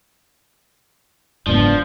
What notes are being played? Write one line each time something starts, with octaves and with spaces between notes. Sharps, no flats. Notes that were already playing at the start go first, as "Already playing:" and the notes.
F#1 G#2 F3 B3 D4